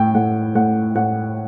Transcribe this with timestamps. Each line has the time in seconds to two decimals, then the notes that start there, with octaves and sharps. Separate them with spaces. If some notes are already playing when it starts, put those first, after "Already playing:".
Already playing: A2 G5
0.14 A2 F#5
0.55 A2 F#5
0.95 A2 F#5